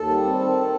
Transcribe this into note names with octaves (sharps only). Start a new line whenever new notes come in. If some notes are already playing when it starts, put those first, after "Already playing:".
Already playing: D#2 A4
G3
C4
D#3